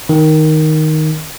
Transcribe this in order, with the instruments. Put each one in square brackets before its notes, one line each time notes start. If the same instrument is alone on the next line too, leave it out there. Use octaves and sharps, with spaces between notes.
[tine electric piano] D#3